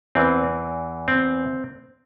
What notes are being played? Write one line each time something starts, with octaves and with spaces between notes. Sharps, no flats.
E2 E3 C4
C4